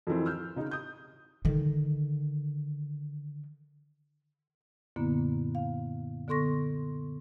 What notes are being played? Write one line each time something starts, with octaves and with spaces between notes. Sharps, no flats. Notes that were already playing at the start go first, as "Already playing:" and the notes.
F2 D#3 E3 C4
E6 F6 G6
C#3 D#4
D#6 G6
D3 D#3
F#2 A#2 D3 A#3 B3 E4
F5
D3 B3 A4 C6 C#6 A#6